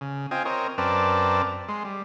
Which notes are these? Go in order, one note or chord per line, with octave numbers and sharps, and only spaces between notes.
C#3
C4 F4 D#5 G5 G#5
C4 A#4 C#5 D#5
F#2 C4 A#4 B4 D5 A5
G#3 C6
G3